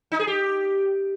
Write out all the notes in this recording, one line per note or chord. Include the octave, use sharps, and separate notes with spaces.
D#4
G#4
G4